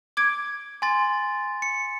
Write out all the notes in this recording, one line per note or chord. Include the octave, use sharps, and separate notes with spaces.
D6 G#6 D7
G#5 C6 A6
C#7